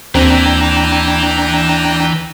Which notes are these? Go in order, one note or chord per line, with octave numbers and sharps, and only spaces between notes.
D#2 E3 C4 D4 G5 A#5